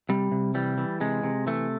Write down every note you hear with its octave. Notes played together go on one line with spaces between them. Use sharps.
C3 G3
C3
E3 G3
E3
C3 G#3
C3
E3 A3